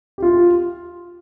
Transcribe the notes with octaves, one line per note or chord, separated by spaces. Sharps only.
G4
F4